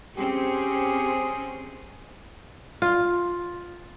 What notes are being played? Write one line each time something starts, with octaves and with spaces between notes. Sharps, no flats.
C4 C#4 G4 G#4 C5
F4